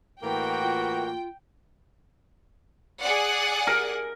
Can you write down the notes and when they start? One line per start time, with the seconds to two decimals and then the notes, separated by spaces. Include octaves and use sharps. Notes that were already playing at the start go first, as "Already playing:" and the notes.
0.23 A2 E3 A#3 F#4 G5
0.62 F4
3.01 G#4 D5 F#5
3.67 A#4